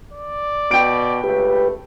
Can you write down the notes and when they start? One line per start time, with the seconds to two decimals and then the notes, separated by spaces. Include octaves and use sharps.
0.13 D5
0.71 B2 G5 D7
1.24 C#2 A3 G4 B4